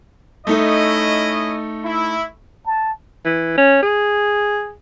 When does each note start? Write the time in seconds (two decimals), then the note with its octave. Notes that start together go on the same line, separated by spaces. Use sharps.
0.47 A3 C#4 D#4 E4 A4 D#5
1.85 E4
2.66 A5
3.25 E3
3.58 C#4
3.83 G#4